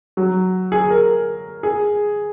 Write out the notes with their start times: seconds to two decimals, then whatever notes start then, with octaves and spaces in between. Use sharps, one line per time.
0.17 F#3
0.72 G#4
0.90 A#4
1.63 G#4